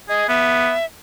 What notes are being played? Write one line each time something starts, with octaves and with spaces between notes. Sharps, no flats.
G#4 D#5
B3 E5